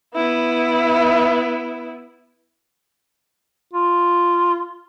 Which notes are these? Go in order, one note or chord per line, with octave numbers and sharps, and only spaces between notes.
B3 E4
F4